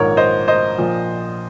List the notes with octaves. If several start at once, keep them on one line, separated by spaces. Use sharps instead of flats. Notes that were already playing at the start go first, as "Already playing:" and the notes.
Already playing: A#1 G#2 D#3 A#4 C#5
C5 D#5
C5 D#5
A#1 A#2 F3